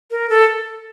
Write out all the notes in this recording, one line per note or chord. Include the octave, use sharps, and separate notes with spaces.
A#4
A4